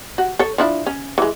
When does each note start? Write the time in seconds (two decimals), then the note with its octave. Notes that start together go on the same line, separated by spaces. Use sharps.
0.18 F#4
0.39 A4 C#5
0.58 F3 D4 E4
0.86 C#4
1.18 E3 G#3